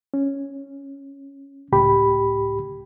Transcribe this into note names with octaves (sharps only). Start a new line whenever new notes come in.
C#4
C#2 A2 G4 B5